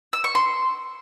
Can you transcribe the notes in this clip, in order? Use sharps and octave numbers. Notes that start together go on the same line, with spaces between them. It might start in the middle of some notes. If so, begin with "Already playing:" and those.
E6
C#6
C6